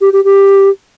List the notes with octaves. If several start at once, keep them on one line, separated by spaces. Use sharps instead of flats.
G4
G4
G4